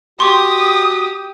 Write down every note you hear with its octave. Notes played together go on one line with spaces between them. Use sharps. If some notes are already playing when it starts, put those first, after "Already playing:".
F#4 G4 C6 C#6 D#6